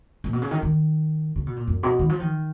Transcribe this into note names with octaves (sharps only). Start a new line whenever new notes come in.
A#2
B2
C#3
D#3
D#3
C#3
B2
A#2
F#2
B2
D#3
F3
D#3